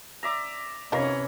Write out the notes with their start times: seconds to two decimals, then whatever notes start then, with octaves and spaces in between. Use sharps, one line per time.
0.23 D5 E5 A#5
0.92 C3 E3 C#4 D#4 F4 A#4 C#5 A#5